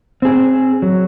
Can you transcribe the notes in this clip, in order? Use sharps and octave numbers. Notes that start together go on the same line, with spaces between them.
C4 G#4
F#3